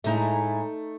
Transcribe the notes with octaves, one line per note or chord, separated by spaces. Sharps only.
A2 G#3 A3 D#4 E4 A#5